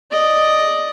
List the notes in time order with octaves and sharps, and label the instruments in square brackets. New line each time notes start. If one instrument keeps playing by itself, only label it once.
[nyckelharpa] D5 D#5